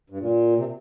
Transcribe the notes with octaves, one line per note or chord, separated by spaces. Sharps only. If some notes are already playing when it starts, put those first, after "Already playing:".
G2
A#2
C3